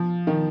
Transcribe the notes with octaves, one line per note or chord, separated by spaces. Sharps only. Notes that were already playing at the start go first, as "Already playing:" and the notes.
Already playing: F3
D#3